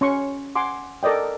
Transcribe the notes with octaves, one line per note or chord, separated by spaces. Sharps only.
C#4 C6 C#6
F#5 G#5 C6 D6
A4 A#4 D5 D#5 G5